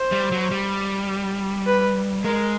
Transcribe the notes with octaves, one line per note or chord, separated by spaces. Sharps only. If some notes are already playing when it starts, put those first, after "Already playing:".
Already playing: C5
G3
F#3
G3
B4
G#3 A#4